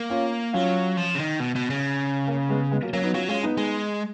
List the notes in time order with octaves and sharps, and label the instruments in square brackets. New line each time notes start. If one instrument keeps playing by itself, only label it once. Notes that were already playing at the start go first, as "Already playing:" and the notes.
Already playing: [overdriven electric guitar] A#3
[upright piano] C#4 F4
[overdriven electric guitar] F#3 [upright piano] C#4 F4
[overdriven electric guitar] F3
C#3
D#3
B2
B2
C#3
[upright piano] A#3 C#4
G#3 B3
G#3 B3
F#3 A#3
[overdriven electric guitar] F#3 [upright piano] A#3 C#4
[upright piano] B3 D#4
[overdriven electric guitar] F#3 [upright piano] C#4 F4
[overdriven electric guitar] G#3 [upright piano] C#4 F4
[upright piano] B3 D#4
[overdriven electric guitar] G#3